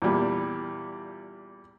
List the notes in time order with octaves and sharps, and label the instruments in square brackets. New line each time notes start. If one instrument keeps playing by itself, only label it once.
[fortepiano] E2 A#2 G3